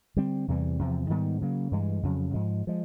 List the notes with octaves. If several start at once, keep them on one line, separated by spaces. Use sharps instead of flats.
D3 G3 C4
E2 C3 E3 G3
E2 C3 F3
G#2 D#3 G3 B3
C#3 F#3 A#3
G2 E3 G#3
F2 C#3 F#3
G#2 F3 G#3
F3 G#3